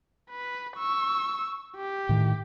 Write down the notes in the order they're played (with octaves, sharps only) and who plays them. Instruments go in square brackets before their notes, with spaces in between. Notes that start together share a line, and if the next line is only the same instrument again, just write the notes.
[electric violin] B4
C#6 E6
G4
[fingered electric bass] A2 D#3